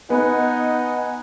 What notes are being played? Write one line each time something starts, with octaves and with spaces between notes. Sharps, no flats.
B3 D#4 D#5 F#5 G#5